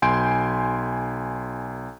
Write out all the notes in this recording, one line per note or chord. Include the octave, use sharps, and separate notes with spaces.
B1 G#5 C6 G6 D7